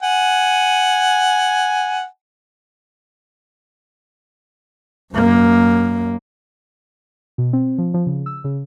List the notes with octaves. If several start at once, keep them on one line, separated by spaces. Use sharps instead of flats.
F#5 G#5
F#2 A#3
B2
C4
F3
F3
C#3
E6
C#3